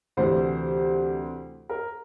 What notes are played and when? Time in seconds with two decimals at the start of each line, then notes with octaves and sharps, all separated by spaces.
0.17 D2 C3 E3 C5
1.69 A#4